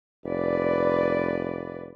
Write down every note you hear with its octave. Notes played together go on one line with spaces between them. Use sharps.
F1 B4 D5